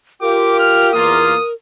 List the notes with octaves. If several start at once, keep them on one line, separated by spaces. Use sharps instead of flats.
F4 G4 A#4 D6
F6
E2 A#3 F4 D#6